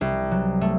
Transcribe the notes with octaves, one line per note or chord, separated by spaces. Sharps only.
C2
F#3
A3